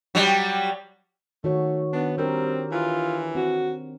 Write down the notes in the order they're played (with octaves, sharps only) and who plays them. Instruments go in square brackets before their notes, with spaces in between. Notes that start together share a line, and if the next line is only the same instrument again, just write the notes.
[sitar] F#3 G3
[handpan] D#3 F#4 C#5 [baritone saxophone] A3
[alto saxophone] B3 [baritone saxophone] D4
[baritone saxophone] G3 [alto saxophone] C4 [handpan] D4 G4 A#4
[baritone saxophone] E3 [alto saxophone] F4
[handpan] C4 [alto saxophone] F#4